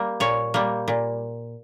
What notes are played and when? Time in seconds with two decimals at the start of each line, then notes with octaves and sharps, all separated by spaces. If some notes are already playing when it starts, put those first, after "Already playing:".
Already playing: G3 A#3
0.20 A#2 C#5
0.54 G3 A#3
0.88 A#2